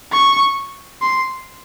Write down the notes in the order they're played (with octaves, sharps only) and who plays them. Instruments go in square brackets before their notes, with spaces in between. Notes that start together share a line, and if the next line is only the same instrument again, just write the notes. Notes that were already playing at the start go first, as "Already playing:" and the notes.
[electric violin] C#6
C6